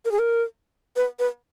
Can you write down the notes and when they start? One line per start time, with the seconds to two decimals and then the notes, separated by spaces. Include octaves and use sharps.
0.05 A#4
0.11 G#4
0.19 A#4
0.96 B4
1.19 B4